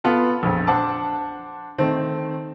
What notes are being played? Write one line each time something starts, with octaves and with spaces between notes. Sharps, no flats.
B3 F4 A4
A#1 F2
D4 C5 F#5 A5 D6
D#3 A3 C4